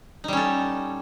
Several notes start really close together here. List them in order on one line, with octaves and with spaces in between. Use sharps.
D#4 G3 C#4 A4